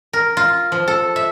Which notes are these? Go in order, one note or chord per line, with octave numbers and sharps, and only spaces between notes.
A#4
F4
F3
A4
E5